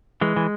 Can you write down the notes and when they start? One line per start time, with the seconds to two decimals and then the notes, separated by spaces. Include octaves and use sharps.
0.21 E3 G#3
0.36 E3